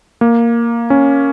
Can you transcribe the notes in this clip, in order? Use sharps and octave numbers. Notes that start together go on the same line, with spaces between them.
A#3
C#4